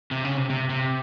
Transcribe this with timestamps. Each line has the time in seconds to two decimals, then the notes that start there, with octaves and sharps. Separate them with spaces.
0.11 C3
0.25 C#3
0.37 C3
0.50 C3
0.70 C3